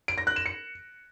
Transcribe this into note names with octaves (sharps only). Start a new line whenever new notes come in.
D7
A#6
F#6
E7
C#7